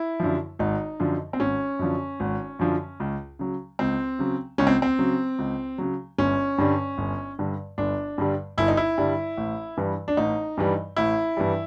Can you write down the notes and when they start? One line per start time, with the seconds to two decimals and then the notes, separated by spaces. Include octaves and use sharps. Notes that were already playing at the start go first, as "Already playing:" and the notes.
Already playing: E4
0.20 F#2 D3 F3
0.59 G#1 D#4
1.00 F#2 D3 F3
1.33 C4
1.40 G#1 C#4
1.79 F#2 D3 F3
2.20 G#1
2.59 F#2 D3 F3
3.00 C#2
3.39 C#3 F#3
3.79 C#2 C4
4.19 C#3 F#3
4.58 C#2 C#4
4.67 C4
4.82 C4
4.99 C#3 F#3
5.39 C#2
5.78 C#3 F#3
6.18 G1 C#4
6.58 G2 D3 G3
6.98 G1
7.39 G2 D3 G3
7.78 G1 D4
8.18 G2 D3 G3
8.58 G1 E4
8.68 D#4
8.77 E4
8.98 G2 D3 G3
9.37 A1
9.77 G2 E3 G3
10.08 D4
10.17 A1 D#4
10.57 G2 E3 G3
10.97 A1 E4
11.37 G2 E3 G3